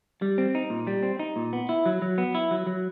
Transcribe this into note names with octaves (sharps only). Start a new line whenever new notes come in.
G3
C4
D#4
A#2
G3
C4
D#4
A#2
B3
E4
F#3
F#3
B3
E4
F#3
F#3